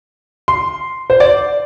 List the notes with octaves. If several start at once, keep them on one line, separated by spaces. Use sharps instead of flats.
C6
C5
D5